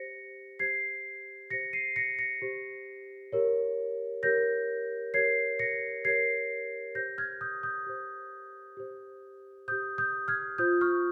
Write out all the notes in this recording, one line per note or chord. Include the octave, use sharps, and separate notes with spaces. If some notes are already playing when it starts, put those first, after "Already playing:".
Already playing: G4 C5 A#6 C#7
G4 C5 G#6 C7
G4 C5 A#6 C#7
C7 D#7
A#6 C#7
A#6 C#7
G4 C5
G4 A#4 C#5
G4 A#4 C#5 G6 A#6
G4 A#4 C#5 G#6 C7
A#6 C#7
G4 A#4 C#5 G#6 C7
G4 C5 G6 A#6
F6 G#6
D#6 G6
D#6 G6
G4 C5
G4 C5
G4 C5 D#6 G6
D#6 G6
F6 G#6
F4 C5 D#6 G6
C#6 F6